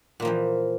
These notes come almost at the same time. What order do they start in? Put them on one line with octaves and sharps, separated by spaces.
A#2 A#3 F3 E3